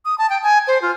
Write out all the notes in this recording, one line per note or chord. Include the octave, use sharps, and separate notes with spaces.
D#6
A5
G5
G#5
C5
F4